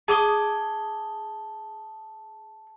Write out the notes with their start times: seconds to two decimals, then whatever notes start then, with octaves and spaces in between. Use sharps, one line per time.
0.08 G#4 A5 D6 D#6 G7